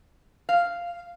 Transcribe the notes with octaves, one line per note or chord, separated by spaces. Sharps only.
F5